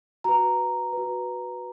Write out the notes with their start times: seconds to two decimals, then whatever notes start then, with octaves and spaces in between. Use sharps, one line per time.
0.24 F#4 B4 A#5
0.93 F#4 B4